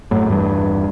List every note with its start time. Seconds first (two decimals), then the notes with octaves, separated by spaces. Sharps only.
0.11 F#2 A2
0.29 E2 G2